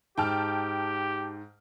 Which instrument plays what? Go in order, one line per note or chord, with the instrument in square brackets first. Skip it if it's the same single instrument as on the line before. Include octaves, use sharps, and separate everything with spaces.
[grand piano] G#2 [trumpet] G4 [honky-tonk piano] G5 A5 F6